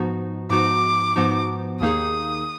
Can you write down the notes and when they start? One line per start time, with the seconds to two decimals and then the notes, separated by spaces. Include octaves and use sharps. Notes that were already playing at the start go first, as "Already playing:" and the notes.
Already playing: G#2 F3 B3 D#4 F#4
0.50 G#2 F3 B3 D#4 F#4 D6
1.16 G#2 F3 B3 D#4 F#4
1.81 D#2 D#3 A#3 D#4 G#4 D#6